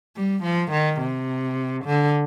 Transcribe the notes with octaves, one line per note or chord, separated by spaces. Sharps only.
G3
F3
D#3
C3
D3